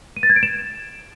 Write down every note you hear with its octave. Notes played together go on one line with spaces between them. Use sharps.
D#7
A6
G#6
D7
E7